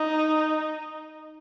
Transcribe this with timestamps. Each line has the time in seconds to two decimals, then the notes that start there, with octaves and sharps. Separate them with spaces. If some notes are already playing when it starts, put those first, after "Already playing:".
Already playing: D#4